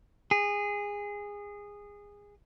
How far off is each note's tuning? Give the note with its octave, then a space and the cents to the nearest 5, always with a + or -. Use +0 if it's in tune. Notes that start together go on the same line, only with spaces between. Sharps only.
G#4 -20